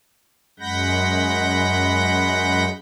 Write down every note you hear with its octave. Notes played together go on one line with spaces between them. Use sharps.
F#2 G#3 F#5 B5 G6 A#6